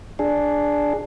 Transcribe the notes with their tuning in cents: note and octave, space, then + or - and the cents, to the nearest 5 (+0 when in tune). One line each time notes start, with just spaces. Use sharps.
D4 +0 G#4 +0